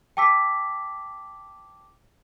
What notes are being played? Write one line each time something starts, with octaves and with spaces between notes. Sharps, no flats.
G5 A5 D6 E6 B6